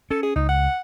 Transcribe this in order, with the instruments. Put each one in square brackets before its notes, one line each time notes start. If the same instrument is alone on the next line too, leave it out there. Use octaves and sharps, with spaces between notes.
[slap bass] C#4 [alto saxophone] A4
[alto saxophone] G#4
[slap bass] C#2 [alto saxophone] D#4
[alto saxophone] F#5